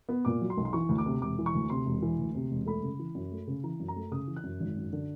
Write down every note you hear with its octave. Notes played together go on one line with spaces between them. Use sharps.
B3
A#2 D6
F#3
C6
B1
C6
E3 C#6
D2
D6
C3
E1 D6
E3
C#6
D2
C3 C6
E1
E3
D2
C3
E1
A3 B5
C#3
E3
F#2
A3
C#3
E3 A#5
F#2
A#5
A3
C#3 D#6
E3
F#6
F#2
G#1
F#2
D3